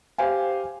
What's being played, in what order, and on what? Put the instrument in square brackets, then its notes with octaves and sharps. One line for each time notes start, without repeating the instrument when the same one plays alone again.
[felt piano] G4 C5 F5 G#5